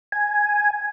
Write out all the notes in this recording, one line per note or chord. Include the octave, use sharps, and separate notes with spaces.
G#5